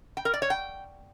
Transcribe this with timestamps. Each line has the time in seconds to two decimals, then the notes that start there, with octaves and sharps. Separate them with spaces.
0.17 G5
0.25 A#4
0.34 D5
0.42 C#5
0.50 G5